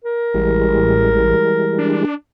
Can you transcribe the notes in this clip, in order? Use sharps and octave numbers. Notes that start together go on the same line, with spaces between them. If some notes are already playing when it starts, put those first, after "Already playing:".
A#4
A1 E3 G3 G#3
D4